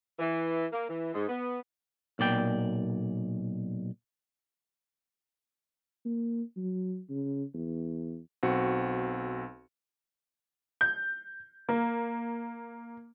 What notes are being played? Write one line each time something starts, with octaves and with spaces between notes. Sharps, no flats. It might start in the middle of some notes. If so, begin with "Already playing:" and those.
E3
A#3
E3
G#2
B3
B1 A#2 D5 G5
A#3
F#3
C#3
E2
B1 C4 F#4 C#7
G6
A#3